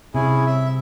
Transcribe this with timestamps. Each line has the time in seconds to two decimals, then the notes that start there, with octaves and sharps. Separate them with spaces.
0.15 C3 C#4 E4 G#4
0.46 E5